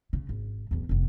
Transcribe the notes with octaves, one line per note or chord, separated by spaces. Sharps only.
C#3
G#1
D1 E2
F1 B3